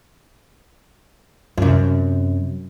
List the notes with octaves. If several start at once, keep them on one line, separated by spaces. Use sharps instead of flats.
F#2 C3